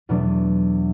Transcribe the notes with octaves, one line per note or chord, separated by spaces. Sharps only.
E2 B2 F#3 A3 D4